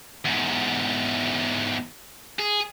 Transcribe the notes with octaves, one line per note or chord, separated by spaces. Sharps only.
E2 G#2
G#4